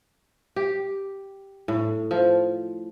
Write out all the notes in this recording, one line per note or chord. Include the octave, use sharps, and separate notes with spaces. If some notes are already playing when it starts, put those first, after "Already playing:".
G4
A2
F3